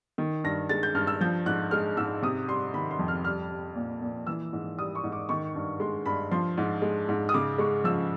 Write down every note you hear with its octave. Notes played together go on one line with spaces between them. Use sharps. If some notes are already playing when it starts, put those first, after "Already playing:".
D#3
G2 A#6
G#3 A6
G6
G2 F6
E6
F3 G6
G#2 F#6
G#3 F6
G#2 E6
C3 D#6
G3 C6
D#3 B5
C6
F2
F6
G3 F6
G3
A#2
A#2
E3 E6
G#2
G3 D#6
C#6
G#2
D6
D#3 C#6
G2
G#3 C6
G2 B5
F3 C6
G#2
G#3
G#2
D#6
C#3 D6
G#3 C#6
F3 E6